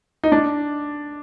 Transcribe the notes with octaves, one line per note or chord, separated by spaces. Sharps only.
D#4
D4